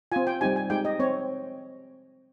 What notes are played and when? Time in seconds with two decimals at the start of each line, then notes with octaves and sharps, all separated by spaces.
0.12 C4 F4 G#5
0.27 G5
0.41 G3 C4 D#4 G4 G#5
0.56 G#5
0.70 G#3 D#4 G4 G5
0.85 D#5
1.00 C4 C#5